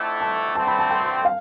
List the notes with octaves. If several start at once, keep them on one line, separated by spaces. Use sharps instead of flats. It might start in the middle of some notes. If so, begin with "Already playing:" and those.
Already playing: F2 D3 A3 E4
A5
D3 A3 C4 A5
B5
A5
G5
F5